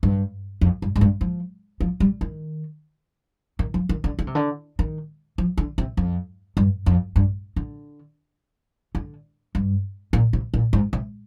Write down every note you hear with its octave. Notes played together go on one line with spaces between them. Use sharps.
G2
F2
G2
G#2
G2
F3
F3
G3
D#3
D#3
F3
D#3
D3
D3
C3
D3
D#3
F3
D3
C3
F2
G2
F2
G2
D3
D3
G2
A#2
C3
A#2
G#2
C3